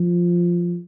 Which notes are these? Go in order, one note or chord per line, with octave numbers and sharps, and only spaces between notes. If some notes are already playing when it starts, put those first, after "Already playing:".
Already playing: F3